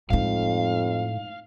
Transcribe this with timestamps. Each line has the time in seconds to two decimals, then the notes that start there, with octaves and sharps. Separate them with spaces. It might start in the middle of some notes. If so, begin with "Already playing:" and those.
0.10 F2 A2 G#3 D#4 F5